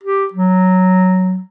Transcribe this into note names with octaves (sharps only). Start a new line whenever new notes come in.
G4
F#3